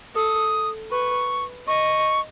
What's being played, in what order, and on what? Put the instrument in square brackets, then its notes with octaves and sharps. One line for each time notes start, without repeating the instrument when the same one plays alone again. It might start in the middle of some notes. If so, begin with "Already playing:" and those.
[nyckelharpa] A4 [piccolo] D#6
[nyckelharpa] B4 [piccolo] C#6
[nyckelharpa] D#5 [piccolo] C#6